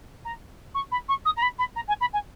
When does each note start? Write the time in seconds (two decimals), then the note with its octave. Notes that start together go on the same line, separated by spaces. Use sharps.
0.24 A#5
0.74 C#6
0.91 B5
1.08 C#6
1.25 D#6
1.36 A#5
1.42 B5
1.58 B5
1.75 A#5
1.88 G#5
2.00 B5
2.13 G#5